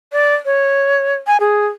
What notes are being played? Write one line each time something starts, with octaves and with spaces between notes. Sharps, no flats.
D5
C#5
G#5
G#4